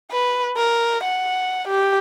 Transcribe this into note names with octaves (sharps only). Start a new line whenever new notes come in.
B4
A#4
F#5
G4